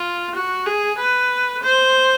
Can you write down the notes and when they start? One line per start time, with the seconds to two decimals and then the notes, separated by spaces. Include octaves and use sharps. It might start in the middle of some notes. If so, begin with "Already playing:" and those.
Already playing: F4
0.35 F#4
0.67 G#4
0.98 B4
1.63 C5